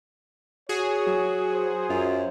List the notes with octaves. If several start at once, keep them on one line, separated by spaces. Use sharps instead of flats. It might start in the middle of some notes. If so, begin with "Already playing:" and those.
F#4 G#4 C#5
F#3
C5
F#2 F4